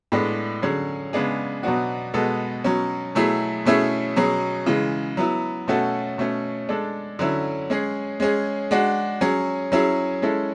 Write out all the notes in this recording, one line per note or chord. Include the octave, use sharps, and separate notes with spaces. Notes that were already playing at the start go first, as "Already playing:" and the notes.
A2 G#3 B3 D4
D3 F#3 C#4 G#4
C#3 G#3 B3 D4 G#4
B2 F#3 B3 D4 F#4
B2 G#3 B3 F#4 A4
B2 F#3 C#4
B2 F#3 A3 E4 G#4
B2 A3 C#4 E4 G#4
B2 F#3 C#4 G#4
C#3 E3 G#3
F#3 B3 E4
B2 A3 C#4 F#4 A4
B2 A3 C#4
G#3 D4 A4
D3 F#3 C#4 E4
G#3 C#4 G#4
G#3 C#4 G#4
G#3 D4 F#4
F#3 C#4 G#4
F#3 C#4 E4 G#4
G#3 C#4 E4 A4